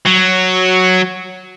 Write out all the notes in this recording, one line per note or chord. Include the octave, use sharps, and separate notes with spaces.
F#3